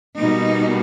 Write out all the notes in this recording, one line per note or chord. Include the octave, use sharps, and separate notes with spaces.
B2 G3 A#3 D#4